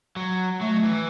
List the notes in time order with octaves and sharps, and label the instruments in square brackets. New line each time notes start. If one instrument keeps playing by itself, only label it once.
[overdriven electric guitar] F#3
[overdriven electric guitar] F#3 [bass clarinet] A3
[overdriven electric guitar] E3